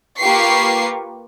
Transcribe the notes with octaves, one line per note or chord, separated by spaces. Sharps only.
A#3 F4 G4 B4 C#6 C7